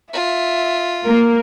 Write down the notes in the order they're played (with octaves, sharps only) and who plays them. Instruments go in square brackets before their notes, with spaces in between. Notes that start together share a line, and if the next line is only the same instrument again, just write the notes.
[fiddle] F4 [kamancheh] E5
[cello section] A#3 [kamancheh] A#4